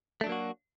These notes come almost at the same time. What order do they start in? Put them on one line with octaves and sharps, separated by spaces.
A3 D4 F#3 A#3 F#4